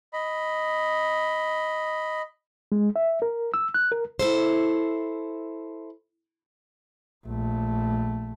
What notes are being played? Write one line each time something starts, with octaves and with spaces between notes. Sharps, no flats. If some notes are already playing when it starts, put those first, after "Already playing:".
D#5 B5
G#3
E5
A#4
E6
F#6
A#4
E4 A4 C5
A#1 A3